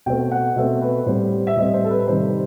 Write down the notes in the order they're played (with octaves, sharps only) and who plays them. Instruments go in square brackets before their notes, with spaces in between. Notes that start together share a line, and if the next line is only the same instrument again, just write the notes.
[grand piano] B2 A3 C4 G5
F#5
B2 A3 C4 E5
B4
A2 G3 C4 C5
E5
A2 G3 C4 D#5
C5
A4
B4
C3 D#3 G3 C5